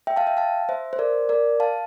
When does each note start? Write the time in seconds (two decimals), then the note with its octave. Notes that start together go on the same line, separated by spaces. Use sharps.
0.07 E5 G5
0.16 F5 A5
0.27 E5 G5
0.37 F5 A5
0.69 C5 E5
0.93 C5
0.99 A#4 D5
1.29 A#4 D5
1.60 F5 A5